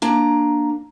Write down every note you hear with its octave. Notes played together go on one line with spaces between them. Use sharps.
A#3 D4 A#5